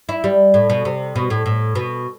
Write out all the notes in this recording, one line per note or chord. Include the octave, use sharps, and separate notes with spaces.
E4
G3
A2
B2
C3
B2
A2
A2
B2